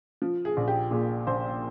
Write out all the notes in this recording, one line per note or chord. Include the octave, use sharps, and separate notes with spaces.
F3
G#4
A#1
G4
A#2 G#4
A#1 C5